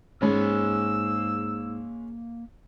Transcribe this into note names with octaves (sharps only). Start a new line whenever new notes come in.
G#2 G#3 A#3 C#4 B5 E6